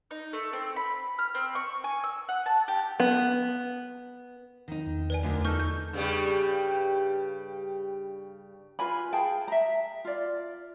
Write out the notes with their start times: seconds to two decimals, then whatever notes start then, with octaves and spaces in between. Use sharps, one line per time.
0.11 D#4
0.33 A3
0.53 C4
0.76 B5
1.19 F6
1.35 C4
1.55 C#6
1.84 G#5
2.04 E6
2.29 F#5
2.46 A5
2.68 G4
3.00 B3
4.68 D#3 D#4
4.86 E2
5.10 B4 D5 G#5
5.23 D2 D3 A#4
5.45 D#4 A4 C#6 F6 G6
5.60 G6
5.93 G2 C#3 G3
8.79 F4 B4 G#5 B5
9.12 G#4 F5 G5 A5
9.48 E5 A#5
10.05 F4 D5